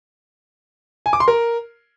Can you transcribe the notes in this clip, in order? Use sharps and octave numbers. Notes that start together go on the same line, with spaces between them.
G#5
D6
C6
A#4